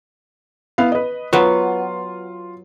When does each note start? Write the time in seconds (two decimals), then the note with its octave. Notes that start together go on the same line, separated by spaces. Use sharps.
0.78 B3 E4 F5
0.92 B4 D#5
1.33 F#3 B3 F4